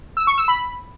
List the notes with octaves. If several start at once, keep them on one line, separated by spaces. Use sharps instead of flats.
E6
C#6
E6
B5